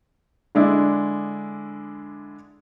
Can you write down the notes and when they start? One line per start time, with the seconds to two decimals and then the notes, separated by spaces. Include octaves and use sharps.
0.55 D3 G#3 D4 E4